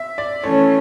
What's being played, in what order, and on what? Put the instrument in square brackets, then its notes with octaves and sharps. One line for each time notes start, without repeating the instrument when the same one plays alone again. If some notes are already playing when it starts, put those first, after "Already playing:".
Already playing: [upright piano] E5
D5
[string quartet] E3 A3 C#4 [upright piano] C#5